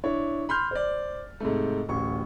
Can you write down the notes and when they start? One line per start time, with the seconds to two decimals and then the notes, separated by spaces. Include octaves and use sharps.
0.04 D4 E4 C#5
0.49 B5 C6 F6 G6
0.71 C5 D5
1.40 G#2 C3 A3
1.88 D1 A1 C#6